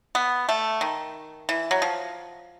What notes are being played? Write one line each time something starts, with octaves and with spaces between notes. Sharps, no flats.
B3
A3
D#3
E3
F#3
F3